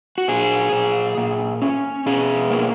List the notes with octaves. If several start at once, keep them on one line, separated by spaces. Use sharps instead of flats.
F#4
A#2 G#4
A#2
A#2
C#4
B2 G#4
A#3